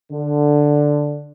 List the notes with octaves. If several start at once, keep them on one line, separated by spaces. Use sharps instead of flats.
D3